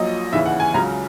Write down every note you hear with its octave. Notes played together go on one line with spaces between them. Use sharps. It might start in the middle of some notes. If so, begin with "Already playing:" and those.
Already playing: A#1 A#2 F#3 D#5
D#2 C#3 E3 E5
F#5
G#5
C#2 C#3 F#3 A#5